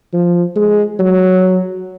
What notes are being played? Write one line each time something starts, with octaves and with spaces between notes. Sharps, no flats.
F3
G#3
F#3